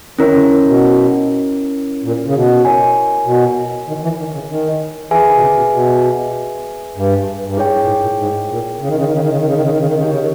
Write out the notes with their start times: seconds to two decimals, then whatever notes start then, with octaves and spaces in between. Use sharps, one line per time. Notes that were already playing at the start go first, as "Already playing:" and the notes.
0.19 D#3 C#4 E4 A#4 C#5
0.34 C#3
0.50 D#3
0.65 B2
2.03 A#2
2.27 C#3
2.34 B2
2.65 E4 A#4 C#5 G#5
3.26 B2
3.88 D#3
4.03 E3
4.19 D#3
4.34 C#3
4.49 D#3
5.11 E3 G#4 B4 E5 G#5
5.26 D#3
5.36 B2
5.42 C#3
5.57 B2
5.72 B2
6.95 G2
7.45 G2
7.57 G#2 E4 G#4 C#5 G5
7.72 G2
7.83 A#2
7.88 G#2
8.02 A#2
8.18 G#2
8.49 A#2
8.80 C#3
8.88 D#3
8.96 C#3
9.05 D#3
9.12 C#3
9.21 D#3
9.29 C#3
9.38 D#3
9.46 C#3
9.53 D#3
9.62 C#3
9.70 D#3
9.78 C#3
9.86 D#3
9.94 C#3
10.02 D#3 D#4 G4 C#5
10.10 C#3
10.19 D#3